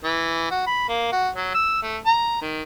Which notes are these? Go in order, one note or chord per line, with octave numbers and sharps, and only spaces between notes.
E3
F#4
B5
A#3
F#4
F#3
E6
A3
A#5
D#3